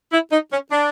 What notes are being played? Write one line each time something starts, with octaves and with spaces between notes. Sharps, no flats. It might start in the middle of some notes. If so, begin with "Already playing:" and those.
E4
D#4
C#4
D4